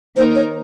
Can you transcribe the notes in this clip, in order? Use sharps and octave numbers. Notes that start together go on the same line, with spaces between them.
D#3 A#3 D#4 A#4 C5
C#5